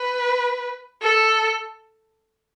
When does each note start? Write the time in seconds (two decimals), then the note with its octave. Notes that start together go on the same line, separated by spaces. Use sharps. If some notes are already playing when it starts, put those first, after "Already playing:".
Already playing: B4
1.02 A4